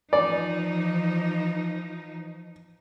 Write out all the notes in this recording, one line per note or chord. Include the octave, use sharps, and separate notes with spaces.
E3 F3 D#4 D5